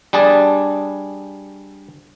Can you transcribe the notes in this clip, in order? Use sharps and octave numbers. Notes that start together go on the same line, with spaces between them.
G3 D4 G#4 A5